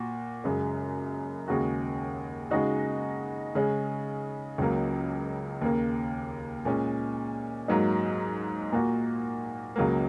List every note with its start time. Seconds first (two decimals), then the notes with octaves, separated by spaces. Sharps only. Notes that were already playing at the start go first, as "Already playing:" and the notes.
Already playing: A#2 F#4
0.44 F#2 C#3 G#3
1.48 D#2 C#3 G#3 F#4
2.51 C#3 G#3 D#4 F#4
3.55 C#3 G#3 C#4
4.58 C#2 C#3 F#3 A#3
5.62 D#2 C#3 A#3
6.65 A#2 G#3 C#4
7.68 G#2 F#3 A#3 D#4
8.72 A#2 A#3 F#4
9.76 C#2 C#3 F#3 A#3